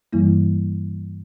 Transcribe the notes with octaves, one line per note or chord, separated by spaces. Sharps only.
G2 E3 G3 A#3 E4